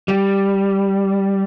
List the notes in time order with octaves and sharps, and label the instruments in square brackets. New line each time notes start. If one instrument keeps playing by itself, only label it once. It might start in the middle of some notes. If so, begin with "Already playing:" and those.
[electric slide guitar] G3